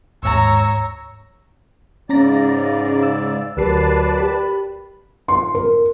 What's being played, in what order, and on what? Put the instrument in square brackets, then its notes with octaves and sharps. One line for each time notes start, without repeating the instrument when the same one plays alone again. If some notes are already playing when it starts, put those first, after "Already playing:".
[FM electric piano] D#2 G#2 [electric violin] C#5 A#5 [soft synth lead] E6
[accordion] G#2 C#3 D5 [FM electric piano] C#4 A#5 A#6
[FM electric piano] E6
[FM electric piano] D2 G4 C7 [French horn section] F#3 A#4 [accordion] B4 D5 A5
[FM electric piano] G4 B5
[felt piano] C6
A#4